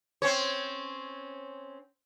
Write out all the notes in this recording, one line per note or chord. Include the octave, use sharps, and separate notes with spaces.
C4 C#4 C#5